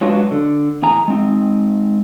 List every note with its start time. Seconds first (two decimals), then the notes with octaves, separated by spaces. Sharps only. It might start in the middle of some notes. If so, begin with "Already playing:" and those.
0.01 F#3 G#3 D4 F4 F#4 B4
0.31 D3
0.82 E2 A2 G#4 A#5
1.08 G#3 C4 D#4